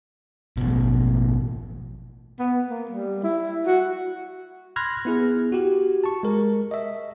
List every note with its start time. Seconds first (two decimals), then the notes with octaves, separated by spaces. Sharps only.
0.57 A1 B2
2.39 B3
2.70 A#3
2.91 G3
3.24 E4
3.66 F#4
4.76 B5 C6 F6 F#6 G#6 A#6
5.05 B3 E4 G#4
5.52 F#4 G4
6.04 A5 C#6
6.23 G#3 A#4
6.71 D#5 E5